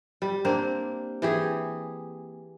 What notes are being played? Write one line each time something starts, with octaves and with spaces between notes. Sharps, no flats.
G3
A#3 C4 D4 C5
E3 G4 G#4